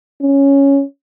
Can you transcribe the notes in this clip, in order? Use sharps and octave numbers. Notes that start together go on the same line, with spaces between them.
C#4